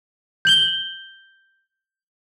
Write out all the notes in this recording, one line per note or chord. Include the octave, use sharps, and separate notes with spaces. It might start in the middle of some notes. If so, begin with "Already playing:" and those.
G6 F#7 G7